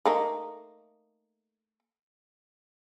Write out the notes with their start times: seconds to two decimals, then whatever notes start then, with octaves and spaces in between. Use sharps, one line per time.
0.05 A3 A#3 D#4